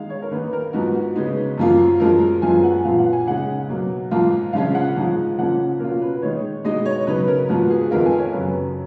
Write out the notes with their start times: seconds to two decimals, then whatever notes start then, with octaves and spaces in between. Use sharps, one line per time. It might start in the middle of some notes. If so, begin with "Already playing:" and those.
Already playing: D#3 G#3 D#4 F5
0.10 C#5
0.22 A#4
0.31 D#3 A#3 D#4 B4
0.53 A#4
0.73 G#2 F3 B3 D#4 F#4
0.95 F#4
1.16 C#3 G#3 B3 D#4
1.58 F#2 F3 A#3 F4
2.00 F#2 F3 G#3 A#4
2.42 F#2 F3 G#3 B3 F4 G#5
2.64 F#5
2.85 A#2 F3 B3 F4 F5
2.98 F#5
3.12 G#5
3.27 C#3 G#3 D#4 F#5
3.69 B2 F#3 A#3
4.11 G#2 F3 A#3 F4
4.53 C#3 F3 G#3 C#4 F4 F5
4.75 F#5
4.96 G#2 F3 G#3 D#4
5.38 C#3 F3 A#3 C#4 F#5
5.80 B2 A#3 C#4 F4 A#4
6.02 B4
6.22 D#3 G#3 D#4 C#5
6.64 B2 G#3 D#4 D#5
6.85 C#5
7.07 C#3 F#3 B3 D#4 B4
7.28 A#4
7.49 G#2 F3 B3 F#4
7.70 G#4
7.91 F2 D#3 G#3 B3 F4 A#4
8.06 G#5
8.19 C#5
8.33 F#2 C#3 F#3 C#4 B4